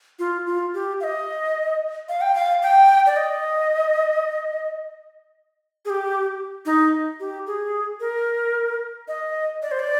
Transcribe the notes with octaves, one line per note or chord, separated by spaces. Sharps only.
F4
F4
G4
F5
D#5
F5
G5
F5
G5
D5
D#5
G#4
G4
D#4
G4
G#4
A#4
D#5
D5
C5
D5